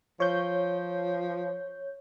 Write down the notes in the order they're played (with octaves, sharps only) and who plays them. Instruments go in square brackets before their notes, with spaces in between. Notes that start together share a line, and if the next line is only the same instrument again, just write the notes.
[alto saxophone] F3 [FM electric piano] C#5 G6